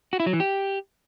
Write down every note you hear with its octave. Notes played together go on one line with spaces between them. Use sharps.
F#4
E4
F#3
E3
G4